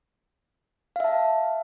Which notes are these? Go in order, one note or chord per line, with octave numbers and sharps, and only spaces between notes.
E5 F5 A5